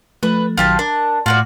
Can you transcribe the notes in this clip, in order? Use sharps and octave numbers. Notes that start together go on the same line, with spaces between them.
F3 A3 B4
A#1 D#3 F#3 F4 G4 A5
D4 A#4
A2 F4 F#4 D5